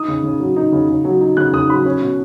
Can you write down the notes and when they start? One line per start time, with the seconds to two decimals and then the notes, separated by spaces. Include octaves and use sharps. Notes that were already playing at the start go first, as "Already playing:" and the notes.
Already playing: D#4 D#6
0.08 C#3
0.24 C#3
0.40 F#3
0.56 D#4
0.72 C#3
0.89 C#3
1.05 F#3
1.21 D#4
1.37 C#3 F#6
1.53 C#3 D#6
1.70 F#3 B5
1.86 C#4
2.01 B2